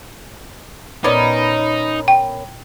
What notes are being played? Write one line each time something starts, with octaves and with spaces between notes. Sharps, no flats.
A#2 B3 C#4 D#4 A#4 D5
G5